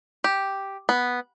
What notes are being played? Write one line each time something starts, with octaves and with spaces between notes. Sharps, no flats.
G4
B3